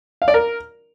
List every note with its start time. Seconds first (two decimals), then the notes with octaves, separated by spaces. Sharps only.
0.22 F5
0.28 D5
0.34 A#4